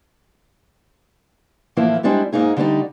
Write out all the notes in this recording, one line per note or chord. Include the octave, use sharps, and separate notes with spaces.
A2 E3 F3 A#3 E4
G3 G#3 C4 D4 E4 G4
G#2 A#3 D#4 G#4
D3 G3 A3 C#4 D#4